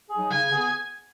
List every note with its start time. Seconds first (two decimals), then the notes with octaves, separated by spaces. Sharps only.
0.10 F#3 D#4 G#4
0.30 C#3 G#5
0.49 B3 G#4